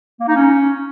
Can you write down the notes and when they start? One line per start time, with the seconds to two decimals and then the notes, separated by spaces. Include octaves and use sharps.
0.20 A#3
0.28 D#4
0.35 C#4